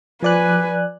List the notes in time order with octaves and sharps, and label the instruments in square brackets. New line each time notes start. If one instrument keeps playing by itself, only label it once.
[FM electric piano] F3 D5 F#6 [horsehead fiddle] B4 G#5